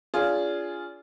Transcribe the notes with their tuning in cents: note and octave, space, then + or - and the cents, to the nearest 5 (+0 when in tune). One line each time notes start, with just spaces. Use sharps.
D4 -35 F4 -10 G#4 +0